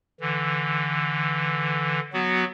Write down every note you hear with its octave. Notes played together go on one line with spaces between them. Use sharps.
D3 E3
F#3 B3 F#4